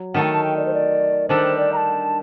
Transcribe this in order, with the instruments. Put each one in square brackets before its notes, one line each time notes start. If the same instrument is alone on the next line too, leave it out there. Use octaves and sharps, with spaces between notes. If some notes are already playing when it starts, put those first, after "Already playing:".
Already playing: [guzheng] F#3
[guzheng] D#3 A3 D#4 A4 [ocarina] F#5
[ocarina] G5
A5
G5
D5
C5
D5
[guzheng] D#3 G3 D4 A4 [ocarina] C5
[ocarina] D5
A#5
A5